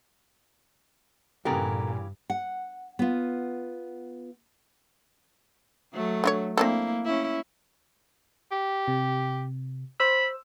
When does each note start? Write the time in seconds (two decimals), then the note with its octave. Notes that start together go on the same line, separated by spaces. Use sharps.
1.45 G2 A#2 C#3 E3 B3 G4 A4 A#4
2.30 F#5
2.99 B3 F4
5.93 F#3 A3
6.24 D3 F4 C#5
6.57 A#3 C4 D4 E4 A4
7.05 C#4 E4
8.51 G4
8.88 C3
10.00 C5 B5 E6